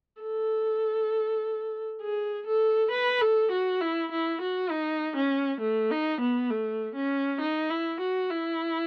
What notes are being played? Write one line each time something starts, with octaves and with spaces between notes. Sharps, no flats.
A4
G#4
A4
B4
A4
F#4
E4
E4
F#4
D#4
C#4
A3
D#4
B3
A3
C#4
D#4
E4
F#4
E4